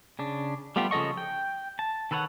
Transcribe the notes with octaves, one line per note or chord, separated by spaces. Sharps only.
C#3 D4
G3 A3 B3 F4 G4
C#3 F3 A4 D#5 C#6
G5
A5
D#3 A4 B4 C#5 F#5